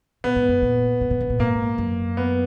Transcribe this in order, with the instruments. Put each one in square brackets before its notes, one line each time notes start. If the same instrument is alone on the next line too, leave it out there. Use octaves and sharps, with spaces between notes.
[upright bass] A#2 [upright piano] B3
[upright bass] G#2
F#2
A#2
A#2
B2
C#3
A#2
[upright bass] G#2 [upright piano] A#3
[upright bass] F#2
[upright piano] B3